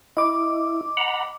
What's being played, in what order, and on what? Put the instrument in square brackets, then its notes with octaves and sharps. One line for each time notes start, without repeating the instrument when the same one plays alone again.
[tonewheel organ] E4 [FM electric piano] D#5 D6
[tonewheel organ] F#5 A#5 B5